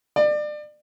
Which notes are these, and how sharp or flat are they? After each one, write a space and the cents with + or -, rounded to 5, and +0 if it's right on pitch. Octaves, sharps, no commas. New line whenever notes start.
D5 +30